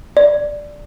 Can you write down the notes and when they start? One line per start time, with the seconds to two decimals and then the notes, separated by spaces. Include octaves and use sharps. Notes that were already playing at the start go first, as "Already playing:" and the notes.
0.17 D5